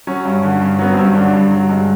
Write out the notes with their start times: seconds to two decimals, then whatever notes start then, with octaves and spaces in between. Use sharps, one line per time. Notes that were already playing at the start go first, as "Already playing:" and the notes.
0.07 F#3 C#4
0.25 G2
0.43 D3
0.61 G2
0.79 F#3 B3
0.93 G2 C4
1.03 C#4
1.15 D3 D4
1.33 G2
1.51 F#3
1.69 G2 G#3